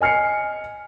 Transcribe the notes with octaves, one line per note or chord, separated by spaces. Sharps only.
D#5 G#5 F6 C7 C#7